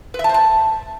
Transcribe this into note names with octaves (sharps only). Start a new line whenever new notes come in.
B4
E5
A5
C5
A5